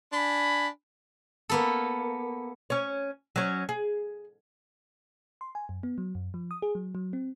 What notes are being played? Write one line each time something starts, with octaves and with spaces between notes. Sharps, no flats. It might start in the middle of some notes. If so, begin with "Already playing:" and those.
D4 G#5 B5
A#3 B3 A4
C#4 C#5
F#3 C#4
G#4
C6
G#5
F#2
B3
F#3
F#2
F3
D#6
G#4
F#3
F#3
C4